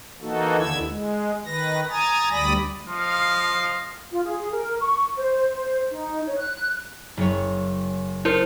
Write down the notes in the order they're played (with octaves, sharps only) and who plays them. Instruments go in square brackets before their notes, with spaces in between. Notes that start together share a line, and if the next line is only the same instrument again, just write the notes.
[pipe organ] E3 A#3 D#4 F#4 A4
D#2 D3 E4 E6 G#6
G#3
D#3 B4 A#6
G#5 A#5 D#6 A6
D2 G3 D5 B5 D#6 A#6
[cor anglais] F3 [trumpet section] D#5 F5
[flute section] F4
G#4
A#4
C#6
C5
C5
D#4
C#5
F#6
[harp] F#1 C#5
[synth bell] E4 A#4 C5 [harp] C6 G6 A6